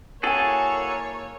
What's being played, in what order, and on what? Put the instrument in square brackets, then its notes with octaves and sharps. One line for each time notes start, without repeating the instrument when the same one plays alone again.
[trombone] A#3 [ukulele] E4 G#5 [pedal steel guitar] F#4 G#4 A4 [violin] C#5